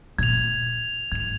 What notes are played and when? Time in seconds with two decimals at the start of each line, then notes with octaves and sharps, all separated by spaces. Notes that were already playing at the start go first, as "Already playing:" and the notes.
0.19 A#2 G#6 F7
1.12 G#2 G#6 F7